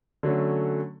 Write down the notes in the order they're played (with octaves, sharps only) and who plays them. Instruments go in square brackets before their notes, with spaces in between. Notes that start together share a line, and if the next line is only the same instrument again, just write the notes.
[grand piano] D3 F#3 A3 C#4